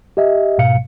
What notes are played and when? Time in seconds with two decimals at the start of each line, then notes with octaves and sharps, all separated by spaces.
0.17 G4 D#5 E5
0.58 G#2 B2 F5 C#7